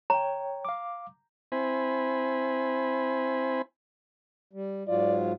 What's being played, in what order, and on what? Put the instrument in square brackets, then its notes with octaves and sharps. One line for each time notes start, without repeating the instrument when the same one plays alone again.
[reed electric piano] C#5 G5 [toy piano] A#5
[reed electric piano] F5 D6
[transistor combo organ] C4 E4 C5 G#5 B5
[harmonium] G3
[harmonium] G#2 F#3 F4 [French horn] D5